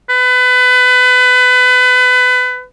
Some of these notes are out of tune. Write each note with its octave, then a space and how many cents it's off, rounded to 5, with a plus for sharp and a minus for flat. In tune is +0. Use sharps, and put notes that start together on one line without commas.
B4 +25